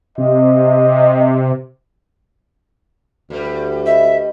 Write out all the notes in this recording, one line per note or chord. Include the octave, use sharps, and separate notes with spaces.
C3 D#5
D2 G2 G3
D#5 E5